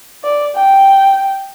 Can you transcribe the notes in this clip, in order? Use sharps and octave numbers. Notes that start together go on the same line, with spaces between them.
D5
G5